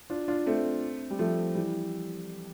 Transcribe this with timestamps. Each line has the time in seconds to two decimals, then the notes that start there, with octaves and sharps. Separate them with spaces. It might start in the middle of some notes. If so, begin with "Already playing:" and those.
0.10 D4 F4
0.28 D4 F4
0.46 A3 C4
1.10 G3
1.19 F3 A3
1.55 E3 G3